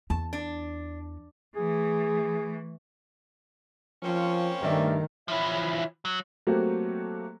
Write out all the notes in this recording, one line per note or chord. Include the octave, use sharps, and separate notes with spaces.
E2 A5
D4
E3 A3 G#4
F3 A#3 C4 C#4
G2 D#3 A3 A#4 D5 E5
E3 F3 E4 C#5 E5
F#3
F#3 A3 A#3 C4 F#4 G4